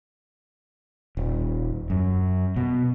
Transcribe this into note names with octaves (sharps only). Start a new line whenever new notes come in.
D#1
F#2
B2